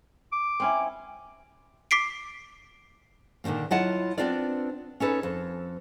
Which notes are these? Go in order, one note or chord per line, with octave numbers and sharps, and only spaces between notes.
D6
C4 C#4 E4
D6 B6 C7 D7
A#2 D3 D#3 F3 A#3
F#3 E4 F4 D#5 F#5 A5
B3 C4 D4 F4 A#4 D5
C#4 D#4 A4 B4
F2